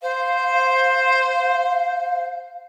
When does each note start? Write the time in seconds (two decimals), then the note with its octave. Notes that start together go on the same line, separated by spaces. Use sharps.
0.02 C5 F5